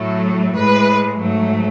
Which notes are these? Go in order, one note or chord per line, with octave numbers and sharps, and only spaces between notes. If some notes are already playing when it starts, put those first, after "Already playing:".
Already playing: A2 F#3 A3
A2 G#3 B4
G#2 F#3 A3